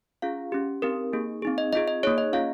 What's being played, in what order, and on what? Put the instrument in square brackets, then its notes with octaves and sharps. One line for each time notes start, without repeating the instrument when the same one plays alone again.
[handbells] C#4 F4 G#4 F5
C#4 G4
C4 D#4 G4 A#4
A#3 D#4 G#4
C4 D#4 G#4
D#5
C4 F4 G#4 D#5
D#5
A#3 D#4 G#4 C#5
D#5
C#4 F4 G#4 F5